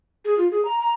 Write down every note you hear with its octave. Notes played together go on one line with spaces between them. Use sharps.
G#4
F4
G#4
A#5
A#5